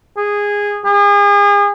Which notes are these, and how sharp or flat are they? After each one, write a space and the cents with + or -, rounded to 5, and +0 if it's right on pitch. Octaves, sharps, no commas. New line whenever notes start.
G#4 -15
G#4 -35